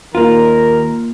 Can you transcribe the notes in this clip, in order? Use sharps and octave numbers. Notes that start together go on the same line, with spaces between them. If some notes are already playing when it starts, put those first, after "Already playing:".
D#2 D#3 A#3 F4 A#4